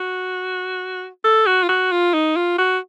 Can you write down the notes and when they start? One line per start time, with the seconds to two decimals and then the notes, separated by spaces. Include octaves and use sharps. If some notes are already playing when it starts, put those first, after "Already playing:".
Already playing: F#4
1.25 A4
1.47 F#4
1.63 F4
1.69 F#4
1.92 F4
2.14 D#4
2.36 F4
2.58 F#4